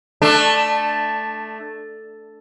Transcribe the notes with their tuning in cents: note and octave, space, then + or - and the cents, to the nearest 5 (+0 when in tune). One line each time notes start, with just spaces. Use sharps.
A3 +0 D4 +15